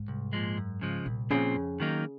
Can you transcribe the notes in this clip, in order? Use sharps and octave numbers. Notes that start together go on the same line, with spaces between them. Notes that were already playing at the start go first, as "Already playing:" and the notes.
Already playing: G#2
C2
A#2 F3 G#3
F#2
C#3 F3 G#3
C2 A#2
A#2 C#3 F3 C4
F2
D#3 F#3 A#3 D#4